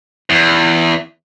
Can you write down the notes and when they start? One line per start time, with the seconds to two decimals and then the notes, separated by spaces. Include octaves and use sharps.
0.30 E2